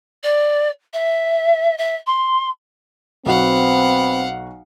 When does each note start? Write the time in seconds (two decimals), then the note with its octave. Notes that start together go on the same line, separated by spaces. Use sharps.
0.23 D5
0.93 E5
1.78 E5
2.06 C6
3.26 B1 B3 C4 F#4 F5 F#5